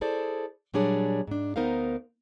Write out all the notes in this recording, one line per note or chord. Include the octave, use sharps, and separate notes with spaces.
E4 G#4 A4 C5 D5
A#2 F#3 G3 D4 G#4 C#5
G#2 D4
D2 B3 D#4 A#4 C5 F5